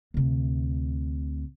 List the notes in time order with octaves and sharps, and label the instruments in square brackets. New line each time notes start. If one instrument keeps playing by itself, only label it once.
[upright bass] D2 C3